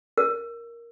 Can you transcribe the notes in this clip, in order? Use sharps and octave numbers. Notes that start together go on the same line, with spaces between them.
A#4